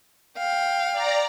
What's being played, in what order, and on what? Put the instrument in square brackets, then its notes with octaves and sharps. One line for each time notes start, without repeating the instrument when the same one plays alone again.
[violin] F5 G5
[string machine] D5 A#5